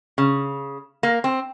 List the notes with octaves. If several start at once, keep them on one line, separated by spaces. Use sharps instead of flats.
C#3
A#3
C4